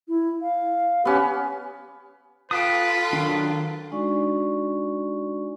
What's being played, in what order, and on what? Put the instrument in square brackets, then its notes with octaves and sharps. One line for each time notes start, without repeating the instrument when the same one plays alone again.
[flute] E4
F5
[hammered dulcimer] B3 C#4 [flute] G4
[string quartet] F4 A4 [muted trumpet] B4 [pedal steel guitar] G5 A5 D#6
[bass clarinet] D#3 [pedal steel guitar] F#3 D4
[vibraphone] G#3 D4 D#4 F#4 D5 C#6